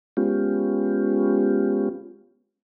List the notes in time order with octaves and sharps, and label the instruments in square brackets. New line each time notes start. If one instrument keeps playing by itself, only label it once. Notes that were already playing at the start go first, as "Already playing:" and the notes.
[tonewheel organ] G#3 B3 C#4 F4 G4